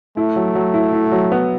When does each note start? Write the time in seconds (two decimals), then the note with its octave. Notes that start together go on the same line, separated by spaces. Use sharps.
0.17 A3 E4
0.36 F#3
0.55 F#3
0.74 E4
0.93 E4
1.12 F#3
1.32 B3